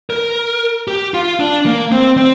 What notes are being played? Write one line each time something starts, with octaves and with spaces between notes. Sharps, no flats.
A#4
G4
F4
D4
A#3
C4
C4